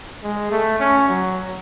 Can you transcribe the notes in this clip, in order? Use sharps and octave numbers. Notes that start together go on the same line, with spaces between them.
G#3
A3
C#4
F#3